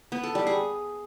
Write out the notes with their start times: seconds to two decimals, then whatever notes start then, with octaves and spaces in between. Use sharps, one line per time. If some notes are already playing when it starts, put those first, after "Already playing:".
0.12 B3
0.23 A4
0.35 G3
0.47 G#4